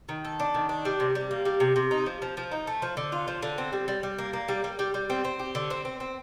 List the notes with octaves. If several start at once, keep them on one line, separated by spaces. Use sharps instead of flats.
D#3
A4
D4
D#3
D4
G3
C3
G3
A#3
G3
C3
C3
D#4
F3
F3
F3
D#4
A3
F3
D3
F4
F3
D3
C4
G3
G3
G3
A#3
A#3
G3
G3
G3
G3
C4
C4
G4
D3
C4
C4
C4